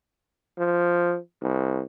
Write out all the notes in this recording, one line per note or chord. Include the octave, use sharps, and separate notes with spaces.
F3
C2